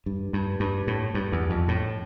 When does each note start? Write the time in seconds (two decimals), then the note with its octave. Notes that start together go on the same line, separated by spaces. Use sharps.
0.06 G2
0.33 G2
0.60 G2
0.87 A2
1.14 G2
1.32 E2
1.50 F2
1.68 A2